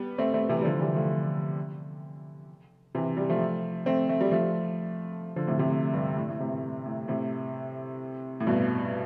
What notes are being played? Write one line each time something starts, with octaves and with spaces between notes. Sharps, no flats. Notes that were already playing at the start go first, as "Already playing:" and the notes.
Already playing: G3 B3
A3 C4
A3 C4
C3 E3
G3
D3 F3
E3 G3
F3 A3
C3 E3
G3
F3 A3
A3 C4
A3
G3
F3 A3
D3 F3
A2 C3
A2 C3
A2
G2
A2
A2
A2 C3
A2
A2
A2 C3
A2
G2 B2